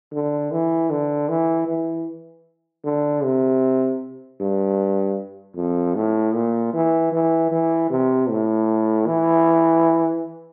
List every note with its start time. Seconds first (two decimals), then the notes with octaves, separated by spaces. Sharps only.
0.12 D3
0.51 E3
0.90 D3
1.29 E3
1.68 E3
2.85 D3
3.23 C3
4.40 G2
5.56 F2
5.95 A2
6.34 A#2
6.73 E3
7.12 E3
7.51 E3
7.90 C3
8.29 A2
9.07 E3